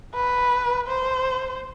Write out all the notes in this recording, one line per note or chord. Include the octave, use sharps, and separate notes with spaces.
B4
C5